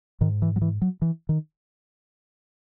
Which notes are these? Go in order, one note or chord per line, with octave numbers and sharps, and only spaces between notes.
G#2 D#3
E3
F#3
E3
F#3
E3
D#3